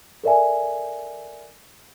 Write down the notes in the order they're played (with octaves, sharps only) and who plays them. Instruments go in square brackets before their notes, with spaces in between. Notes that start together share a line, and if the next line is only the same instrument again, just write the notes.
[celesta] A4 A#4 D5 E5 G#5